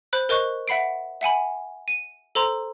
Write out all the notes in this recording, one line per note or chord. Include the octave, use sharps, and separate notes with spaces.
C5 B5 F#6
A#4 C5 D#5 C#6 F#6
E5 F#5 B5 C7 D7
E5 F#5 G#5 B5
D#7
A4 C5 A#5 C6